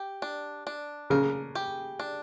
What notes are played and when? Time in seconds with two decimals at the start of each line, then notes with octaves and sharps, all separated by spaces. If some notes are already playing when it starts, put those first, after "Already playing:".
Already playing: G4
0.22 D4
0.67 D4
1.10 C#3 A#4
1.55 G4
2.00 D4